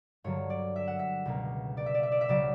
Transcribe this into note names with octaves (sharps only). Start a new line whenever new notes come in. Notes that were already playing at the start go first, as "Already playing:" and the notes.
G2 D3 F#3 A#3 C#5
D5
E5
F#5
E5
C#2 B2 A#3
D5
E5
D5
E5
D5
E5
C#2 C#3 F#3 D5